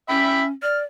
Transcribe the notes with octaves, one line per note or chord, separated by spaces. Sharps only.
C#4 E5 G5 B5
D5 F6